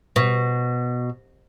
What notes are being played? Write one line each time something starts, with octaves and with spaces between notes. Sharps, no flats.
B2